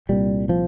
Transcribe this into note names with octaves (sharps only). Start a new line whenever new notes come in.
C2 A#2 G3
F3